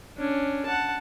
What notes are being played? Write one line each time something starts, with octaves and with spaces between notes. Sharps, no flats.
C#4 D4
F#5 A5